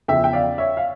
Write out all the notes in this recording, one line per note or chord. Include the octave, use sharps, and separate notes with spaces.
E2 C#3 F3 E5 G5
G5
D5 F5
C#5 E5
F5